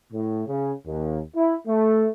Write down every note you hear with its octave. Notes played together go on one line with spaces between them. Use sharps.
A2
C#3
D#2
E4
A3